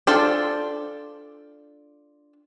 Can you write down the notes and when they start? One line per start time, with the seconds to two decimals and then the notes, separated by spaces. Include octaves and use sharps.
0.07 D4 F4 A4 C5